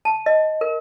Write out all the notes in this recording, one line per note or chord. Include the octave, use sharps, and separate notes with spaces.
A5
D#5
A#4